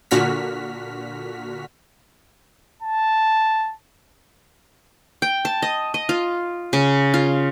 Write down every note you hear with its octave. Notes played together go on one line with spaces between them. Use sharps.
A#2 D3 F#4 F6 B6
A5
G5
A5
D#5
D#5
F4
C#3
F4